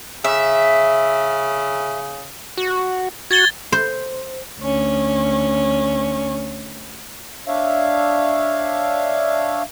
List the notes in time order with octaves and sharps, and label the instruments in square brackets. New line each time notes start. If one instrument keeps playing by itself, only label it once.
[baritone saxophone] C#3 [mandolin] E5
[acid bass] F#4
[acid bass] F#4 [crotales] G#6 A6 G7
[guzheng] C5
[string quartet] D2 C#4
[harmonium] D4 C#5 E5 F5